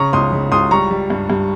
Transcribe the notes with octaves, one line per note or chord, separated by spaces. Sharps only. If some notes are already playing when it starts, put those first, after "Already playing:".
Already playing: C#3 A#5 C#6
C#2 C6 D#6
C#3
C#2 C6 D#6
G3 A#5 C#6
G3
G2
G2